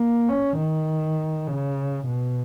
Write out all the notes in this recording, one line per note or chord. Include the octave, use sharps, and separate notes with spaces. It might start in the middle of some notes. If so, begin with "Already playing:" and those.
Already playing: A#3
C#4
D#3
C#3
B2